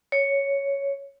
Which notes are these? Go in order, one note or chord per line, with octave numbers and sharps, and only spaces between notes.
C#5